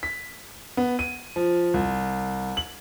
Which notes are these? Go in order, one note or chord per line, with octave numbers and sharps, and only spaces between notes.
B6
B3
D#7
F3
C2
F#7